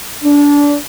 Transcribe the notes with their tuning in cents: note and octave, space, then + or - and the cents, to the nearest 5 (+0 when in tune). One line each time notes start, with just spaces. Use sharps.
D4 -25